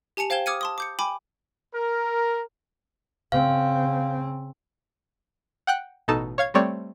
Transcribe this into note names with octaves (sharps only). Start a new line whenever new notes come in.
G4 G#5 A5 C#7 F7
C5 F5 G5 G#6 E7 G7
D6 D#6 F6 G#6 C#7 D#7
A5 C6 D#6
D6 G6 C#7
G5 G#5 B5 D6
A#4
C#3 C4 F5
F#5 G5 F#6
A1 B2 D#4 A4 A5
C#5 F5 G#6
G3 A3 C4 C#5 D5